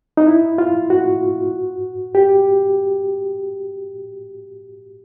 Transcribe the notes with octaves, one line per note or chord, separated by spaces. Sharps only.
D#4
E4
F4
F#4
G4